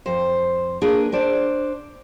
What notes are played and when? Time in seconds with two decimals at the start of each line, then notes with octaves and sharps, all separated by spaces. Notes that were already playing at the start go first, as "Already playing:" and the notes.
0.06 F2 C5
0.81 A#3 D4 G#4 B4
1.12 D4 C5 D5